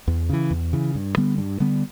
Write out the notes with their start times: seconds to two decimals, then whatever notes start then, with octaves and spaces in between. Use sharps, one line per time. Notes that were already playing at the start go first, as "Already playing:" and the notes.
0.08 E2
0.29 C#3 E3
0.51 E2
0.73 C#3 E3
0.95 G2
1.17 D3 G3 B3
1.38 G2
1.60 D3 G3 B3